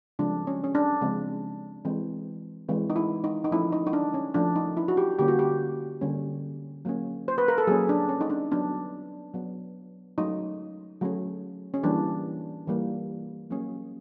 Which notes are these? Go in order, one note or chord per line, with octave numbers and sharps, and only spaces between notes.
C#3 F3 G#3 C4 D4
C#4
C#4
D4
C#3 F3 G#3 C4
E3 G#3 C4
E3 G#3 C4
D#4
E4
D#4
D#4
F3 A3 C#4 E4
D#4
D#4
D4
C#4
F3 A3 C#4 D4
D#4
E4
F#4
G4
D3 G3 A#3 C#4 G4
F#4
G4
D3 G3 A#3 C#4
F#3 A#3 C#4
C5
B4
A#4
A4
F#3 A#3 C#4 G#4
D4
C#4
D#4
D4
F#3 B3 D4
F#3 B3
F#3 A3 C#4 D#4
F#3 A3 C#4
C#4
E3 G3 A#3 D4
E3 G3 A#3
F#3 A#3 C#4